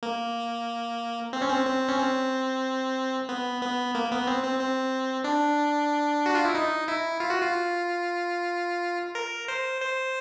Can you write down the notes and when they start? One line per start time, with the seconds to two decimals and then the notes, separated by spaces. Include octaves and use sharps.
0.03 A#3
1.33 C4
1.42 C#4
1.49 C4
1.67 C4
1.89 C#4
1.99 C4
3.29 B3
3.62 B3
3.95 A#3
4.11 B3
4.27 C4
4.43 C4
4.59 C4
5.24 D4
6.26 F#4
6.35 F4
6.45 E4
6.55 D#4
6.88 E4
7.20 F4
7.30 F#4
7.41 F4
9.15 A#4
9.48 C5
9.81 C5